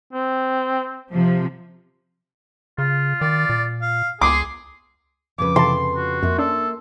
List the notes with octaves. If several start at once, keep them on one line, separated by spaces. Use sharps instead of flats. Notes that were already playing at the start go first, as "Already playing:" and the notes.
C4
C3 F3
C#3 F4
D#3 D5
A#2
F5
C#2 G#4 C6 D6
F2 C#3 B4 D6
C3 E3 A5 C6
F#4
F2 A#3 E5
C#4 D4 A4